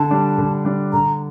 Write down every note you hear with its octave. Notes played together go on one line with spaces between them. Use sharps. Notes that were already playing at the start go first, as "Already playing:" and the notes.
Already playing: D3 A5
G3 D4
D3
G3 D4
D3 A#5